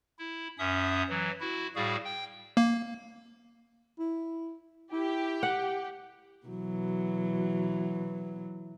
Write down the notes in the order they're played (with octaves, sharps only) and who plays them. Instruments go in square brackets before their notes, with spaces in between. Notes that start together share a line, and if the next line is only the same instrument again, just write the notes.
[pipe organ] E4
F#2 C#4 E5 D#6
E3 F#3
E4 F#4
A2 G3 F#4 G#4 F5
G5
[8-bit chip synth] A#3
[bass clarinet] E4
[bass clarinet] E4 [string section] G4
[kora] F#5
[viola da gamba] B2 E3 F#3